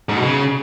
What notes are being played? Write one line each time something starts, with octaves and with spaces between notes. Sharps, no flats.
G#2
B2
C#3